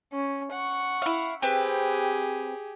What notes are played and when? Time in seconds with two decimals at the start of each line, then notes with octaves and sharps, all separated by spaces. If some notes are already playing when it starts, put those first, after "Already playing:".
0.13 C#4
0.52 F#5 C#6
1.02 E4 F5
1.42 C4 G4 G#4 B4